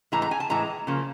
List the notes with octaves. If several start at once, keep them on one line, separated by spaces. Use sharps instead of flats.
A2 E3 G#3 A#5
A#5
G#5
A5
A2 E3 G#3 A#5
C#3 F3 A#3